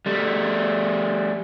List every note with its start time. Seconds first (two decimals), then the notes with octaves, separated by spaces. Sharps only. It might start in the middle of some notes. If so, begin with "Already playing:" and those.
0.06 G3 A3